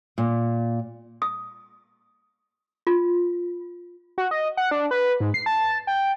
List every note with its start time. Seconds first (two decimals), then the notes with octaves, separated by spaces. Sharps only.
0.18 A#2
1.22 D#6
2.87 F4
4.18 F#4
4.31 D#5
4.57 F#5
4.71 D4
4.91 B4
5.20 G#2
5.34 C7
5.46 A5
5.87 G5